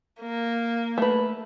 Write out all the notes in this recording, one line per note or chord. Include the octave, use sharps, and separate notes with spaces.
A#3
A3 B4